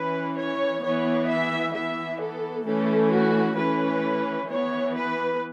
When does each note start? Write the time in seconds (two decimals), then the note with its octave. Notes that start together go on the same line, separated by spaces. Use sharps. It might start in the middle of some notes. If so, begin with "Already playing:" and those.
Already playing: E3 C#4 B4
0.36 C#5
0.82 E3 B3 C#5
1.28 E5
1.73 E3 B3 E5
2.19 A4
2.65 E3 A3 C#4 A4
3.11 F#4
3.57 E3 A3 C#4 B4
4.48 E3 B3 C#5
4.95 B4